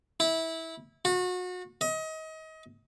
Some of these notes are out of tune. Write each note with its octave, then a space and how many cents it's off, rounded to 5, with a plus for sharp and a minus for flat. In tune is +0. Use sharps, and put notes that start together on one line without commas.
E4 -20
F#4 -30
D#5 +30